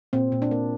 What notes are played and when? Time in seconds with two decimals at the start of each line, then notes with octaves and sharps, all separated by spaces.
0.13 A#2 C4
0.32 A#2
0.42 D4
0.51 A#3